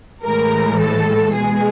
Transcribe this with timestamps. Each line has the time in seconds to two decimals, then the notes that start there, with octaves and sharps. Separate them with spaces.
0.24 A2 E3 G#3 A#4
0.79 A4
1.34 B2 G#3 G#4